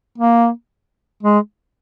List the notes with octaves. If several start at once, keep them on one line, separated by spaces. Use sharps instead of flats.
A#3
G#3